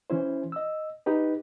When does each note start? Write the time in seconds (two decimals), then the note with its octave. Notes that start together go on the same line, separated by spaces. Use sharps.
0.10 E3 C#4 E4 C5
0.52 D#5 E6
1.06 D#4 G4 B4